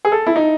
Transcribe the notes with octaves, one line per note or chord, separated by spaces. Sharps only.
G#4
A4
E4
D#4